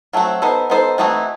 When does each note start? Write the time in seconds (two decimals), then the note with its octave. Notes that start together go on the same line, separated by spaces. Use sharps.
0.13 F#3 A3 C4 F#4
0.42 B3 D#4 A4 C5
0.70 B3 D#4 A4 C5
0.98 E3 A3 C4 D#4 F#4